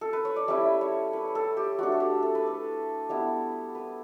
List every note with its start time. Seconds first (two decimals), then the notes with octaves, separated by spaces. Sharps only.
0.01 A4
0.13 B4
0.25 C#5
0.36 D5
0.48 G3 C#4 E4 E5
0.81 C#5
1.13 B4
1.35 A4
1.57 G4
1.79 A3 D4 F#4
1.92 A4
2.00 G4
2.22 A4
2.35 B4
2.47 A4
3.09 G3 B3 E4
3.75 B4